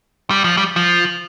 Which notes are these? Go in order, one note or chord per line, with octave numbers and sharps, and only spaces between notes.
G3
F3
G3
F3